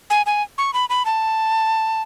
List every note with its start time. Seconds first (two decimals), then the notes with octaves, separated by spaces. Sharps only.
0.10 G#5
0.26 G#5
0.58 C#6
0.74 B5
0.90 B5
1.05 A5